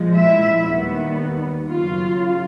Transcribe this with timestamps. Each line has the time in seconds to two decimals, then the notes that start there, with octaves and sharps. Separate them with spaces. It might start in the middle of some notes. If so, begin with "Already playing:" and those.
Already playing: A#2 F3 G#3
0.15 E4 E5
0.67 D#2 D#3 G3 B3
1.71 F#2 C#3 F#3 F4 F5